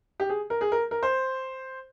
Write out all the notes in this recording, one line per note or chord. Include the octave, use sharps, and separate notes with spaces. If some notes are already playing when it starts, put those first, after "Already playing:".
G4
G#4
A#4
G#4
A#4
A#4
C5